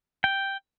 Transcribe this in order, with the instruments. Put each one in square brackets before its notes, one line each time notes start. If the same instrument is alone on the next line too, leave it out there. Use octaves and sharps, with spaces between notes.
[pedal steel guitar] G5